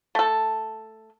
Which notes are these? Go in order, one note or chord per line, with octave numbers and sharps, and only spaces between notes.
A3 A4